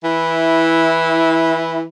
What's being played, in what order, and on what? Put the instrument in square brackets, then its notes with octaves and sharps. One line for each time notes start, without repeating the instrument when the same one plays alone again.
[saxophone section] E3 E4